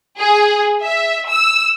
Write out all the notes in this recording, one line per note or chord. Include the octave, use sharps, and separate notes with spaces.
G#4
E5
E6